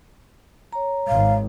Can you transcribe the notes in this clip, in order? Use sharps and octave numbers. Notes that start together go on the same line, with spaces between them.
C#5 A#5
G#1 F5